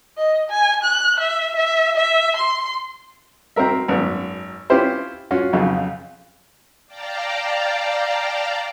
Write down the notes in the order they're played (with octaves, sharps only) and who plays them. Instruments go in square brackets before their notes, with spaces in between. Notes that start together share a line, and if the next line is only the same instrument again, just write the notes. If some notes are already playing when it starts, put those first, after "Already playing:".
[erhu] D#5
G#5
F#6
E5
E5
E5
C6
[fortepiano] C4 F#4 A#4 E5
G#1 F#2 B3
C4 C#4 E4 F4 G4 C5
C#4 F4 F#4
B1 F2 C#3 F#3
[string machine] D5 F5 G5 A5 A#5